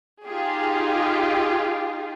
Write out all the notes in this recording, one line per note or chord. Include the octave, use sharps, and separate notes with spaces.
D#4 F4 G4 G#4